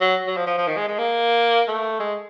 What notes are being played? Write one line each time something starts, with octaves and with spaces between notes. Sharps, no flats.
F#3
F#3
F3
F3
F3
D#3
G#3
G#3
A#3
A3
G#3